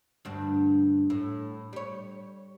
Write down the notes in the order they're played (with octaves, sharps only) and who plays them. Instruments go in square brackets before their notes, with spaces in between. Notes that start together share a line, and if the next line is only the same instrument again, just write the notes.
[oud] D2 G2 D4
A2
G3 C#5